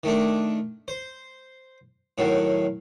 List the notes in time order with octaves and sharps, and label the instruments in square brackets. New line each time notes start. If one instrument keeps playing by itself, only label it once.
[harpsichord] D#3 A3 D4
C5
A2 D#3 F#3